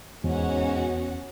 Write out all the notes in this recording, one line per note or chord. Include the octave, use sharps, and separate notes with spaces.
E2 G#2 B2 C#4 F#4 F#5